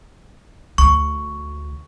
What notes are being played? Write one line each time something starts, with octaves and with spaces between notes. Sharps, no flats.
D2 C#6